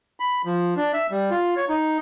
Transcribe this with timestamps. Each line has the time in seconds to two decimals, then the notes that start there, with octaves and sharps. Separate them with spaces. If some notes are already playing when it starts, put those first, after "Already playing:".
0.20 B5
0.45 F3
0.77 D4
0.93 E5
1.11 G3
1.31 F4
1.57 C#5
1.69 D#4